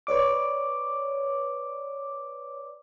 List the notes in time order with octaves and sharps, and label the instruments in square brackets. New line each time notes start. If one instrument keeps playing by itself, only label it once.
[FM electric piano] B4 C#5 D5 D6